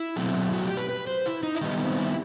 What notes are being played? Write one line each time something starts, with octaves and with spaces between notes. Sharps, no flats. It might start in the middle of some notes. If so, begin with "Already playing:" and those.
Already playing: E4
B2 F#3 A3 C4
F#4
G4
B4
B4
C5
E4
D#4
E4
D#3 G3 B3 D#4
C4
E4